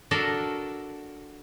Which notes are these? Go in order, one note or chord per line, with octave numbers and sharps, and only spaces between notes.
D4 F#4 A4 A#4